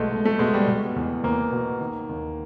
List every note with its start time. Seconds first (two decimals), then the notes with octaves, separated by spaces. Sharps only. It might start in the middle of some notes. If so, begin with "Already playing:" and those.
Already playing: B1 B2 G#3 A3
0.11 B1
0.25 A3
0.39 B2 G#3
0.54 G3
0.67 B2
0.96 E2
1.24 E2 A#3
1.52 B2
1.80 D#3
2.09 D#2